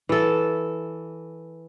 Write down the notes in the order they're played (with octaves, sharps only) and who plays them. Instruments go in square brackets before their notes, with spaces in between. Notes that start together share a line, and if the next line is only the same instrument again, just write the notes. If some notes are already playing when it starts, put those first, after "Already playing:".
[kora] E3 A4